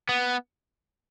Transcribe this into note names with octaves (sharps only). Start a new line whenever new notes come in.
B3